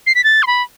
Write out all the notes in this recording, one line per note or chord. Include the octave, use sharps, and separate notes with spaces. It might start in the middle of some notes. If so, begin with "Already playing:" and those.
C7
B6
A6
C6
B5